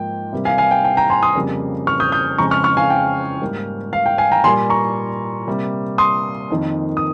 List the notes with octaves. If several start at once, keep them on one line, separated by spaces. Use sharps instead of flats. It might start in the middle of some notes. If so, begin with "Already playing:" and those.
Already playing: G#2 F3 A#3 G5
C3 G3 A#3
F5 G#5
F5 G#5
G5
G5
G5 A#5
G#5 C6
C6 D#6
F2 C#3 G3 A#3
C#6 F6
D#6 G6
D#6 G6
F2 C#3 F3 G#3 A#5 C#6
C#6 F6
C#6 F6
F5 G#5
G5
G#2 G3 A#3
F5
G5
F5 G#5
G5 A#5
A#2 G3 A#3 G#5 C6
A#5 C#6
C3 G3 A#3
C6 D#6
F2 D#3 A#3
D#6